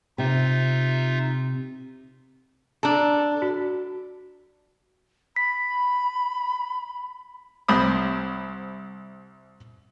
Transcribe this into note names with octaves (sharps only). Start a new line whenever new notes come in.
C3 D#4 F4 E5
D4 A4 A5 A#5
F#4
B5 B6
C2 C4 B5 D#6